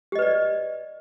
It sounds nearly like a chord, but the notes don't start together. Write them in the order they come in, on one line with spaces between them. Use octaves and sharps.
G4 D#5 B4 D5